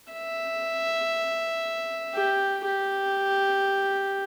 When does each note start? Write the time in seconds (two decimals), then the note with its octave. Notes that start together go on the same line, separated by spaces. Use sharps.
0.13 E5
2.15 G4
2.65 G4